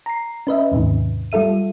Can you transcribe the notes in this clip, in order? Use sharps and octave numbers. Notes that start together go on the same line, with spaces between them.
A#5 C7
C#4 B4 D#5 E5
D#2 G#2 C3 D#3
G3 F4 A4 E5 D#7